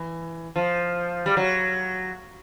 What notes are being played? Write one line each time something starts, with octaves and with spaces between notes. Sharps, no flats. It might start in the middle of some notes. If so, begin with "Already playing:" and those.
Already playing: E3
F3
G3
F#3